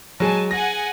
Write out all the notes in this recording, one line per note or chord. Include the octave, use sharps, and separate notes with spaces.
F#3 G#3 G#5 A5
G#4 F#5 G#5 A#6